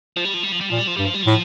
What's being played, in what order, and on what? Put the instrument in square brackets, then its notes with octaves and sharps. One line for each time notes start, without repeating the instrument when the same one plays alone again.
[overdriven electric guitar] F3
G3
F3
G3
F3
G3
[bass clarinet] A#2 [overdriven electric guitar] F3
[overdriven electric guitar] G3
F3
[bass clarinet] G2 [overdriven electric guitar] G3
[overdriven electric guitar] F3
G3
[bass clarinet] A2 [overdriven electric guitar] F3